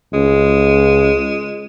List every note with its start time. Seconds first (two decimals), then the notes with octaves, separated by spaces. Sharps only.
0.13 C#2 G#3